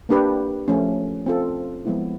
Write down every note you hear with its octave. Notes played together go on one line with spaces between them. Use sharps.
A#3 D4 G4 B4
F3 A3 C#4
C4 F4 A4
F3 G#3 B3 E4